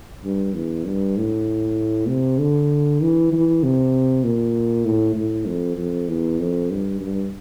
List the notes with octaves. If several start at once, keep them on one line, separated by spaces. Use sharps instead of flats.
G2
E2
G2
A2
C3
D3
E3
E3
C3
A#2
A2
A2
F2
F2
E2
F2
G2
G2